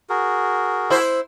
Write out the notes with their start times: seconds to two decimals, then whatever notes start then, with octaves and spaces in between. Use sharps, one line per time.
0.09 F#4 G#4 A#4
0.90 E4 C5